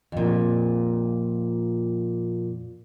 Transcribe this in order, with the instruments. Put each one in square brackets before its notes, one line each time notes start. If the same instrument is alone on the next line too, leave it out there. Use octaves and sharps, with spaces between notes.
[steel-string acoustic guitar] F2 A#2